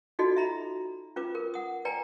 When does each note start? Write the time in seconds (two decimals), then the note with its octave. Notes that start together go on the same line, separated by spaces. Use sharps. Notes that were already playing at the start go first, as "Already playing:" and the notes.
0.19 D#4 F4 F#4 A4 D5 D#5
0.37 E5 A#5 B5
1.16 C#4 F4 B4 D6
1.35 A#4
1.54 F#5 D#6
1.85 B4 D5 G5 G#5 A#5